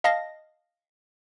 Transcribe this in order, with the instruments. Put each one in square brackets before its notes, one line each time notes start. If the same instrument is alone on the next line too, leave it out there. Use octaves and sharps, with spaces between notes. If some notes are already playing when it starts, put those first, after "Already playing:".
[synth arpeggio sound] D#5 F5 A5 A#6